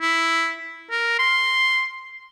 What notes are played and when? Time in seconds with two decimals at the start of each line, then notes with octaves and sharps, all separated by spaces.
0.02 E4
0.91 A#4
1.19 C6